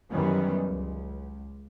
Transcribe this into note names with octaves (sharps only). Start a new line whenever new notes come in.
F#2 D#3 E3 G3 B3 C#4
C#2